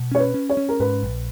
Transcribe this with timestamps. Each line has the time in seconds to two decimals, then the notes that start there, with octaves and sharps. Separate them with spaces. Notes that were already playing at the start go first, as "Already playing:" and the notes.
Already playing: B2
0.11 C#4 C#5
0.19 B4
0.34 C#4
0.50 C#5
0.57 C#4
0.69 A#4
0.80 G#2 B4
1.03 A#1